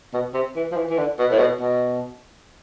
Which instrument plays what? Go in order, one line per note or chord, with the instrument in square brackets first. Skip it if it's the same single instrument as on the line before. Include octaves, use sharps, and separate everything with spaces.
[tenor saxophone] B2
C3
E3
F3
E3
E3
D3
B2
A2
B2
B2